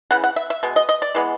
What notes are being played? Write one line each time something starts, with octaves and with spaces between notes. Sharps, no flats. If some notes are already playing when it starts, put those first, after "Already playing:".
C#3 E3 F#5
F#5
E5
E5
B2 G#3
D#5
D#5
D5
E3 G#3 B3